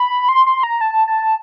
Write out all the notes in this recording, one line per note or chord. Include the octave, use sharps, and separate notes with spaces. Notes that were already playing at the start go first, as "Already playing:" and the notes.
Already playing: B5
C6
C6
A#5
A5
A5